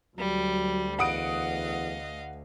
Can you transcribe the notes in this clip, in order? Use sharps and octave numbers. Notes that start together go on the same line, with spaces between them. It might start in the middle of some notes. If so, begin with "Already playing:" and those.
D2 F#3 G3
E2 D#5 F5 F#5 D#6 D7